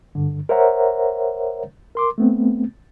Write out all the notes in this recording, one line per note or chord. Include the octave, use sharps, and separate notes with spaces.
G2 D3
A#4 C5 C#5 E5 F#5 A#5
A#4 C6 D6
A3 B3 C4